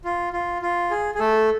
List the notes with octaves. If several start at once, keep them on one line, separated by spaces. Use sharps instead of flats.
F4
F4
F4
G#4
G#4
A3 A4